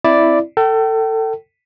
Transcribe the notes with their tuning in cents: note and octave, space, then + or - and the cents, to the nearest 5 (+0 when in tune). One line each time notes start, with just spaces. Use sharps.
C4 -5 E4 +0 D5 +0
A4 +25 G5 -30